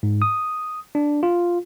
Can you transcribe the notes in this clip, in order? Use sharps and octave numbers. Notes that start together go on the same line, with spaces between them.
G#2
D#6
D4
F4